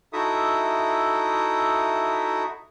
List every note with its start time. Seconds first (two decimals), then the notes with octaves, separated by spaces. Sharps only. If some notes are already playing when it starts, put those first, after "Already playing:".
0.13 D#4 E4 F#4 A4 E5 D#6